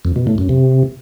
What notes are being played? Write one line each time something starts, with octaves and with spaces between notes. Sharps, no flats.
F2
B2
A2
F#2
C3